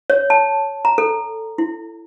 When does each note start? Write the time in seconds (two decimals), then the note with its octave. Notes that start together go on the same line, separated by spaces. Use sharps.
0.10 C#5
0.30 A5
0.85 A#5
0.98 A4
1.58 E4